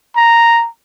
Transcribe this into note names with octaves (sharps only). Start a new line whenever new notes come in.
A#5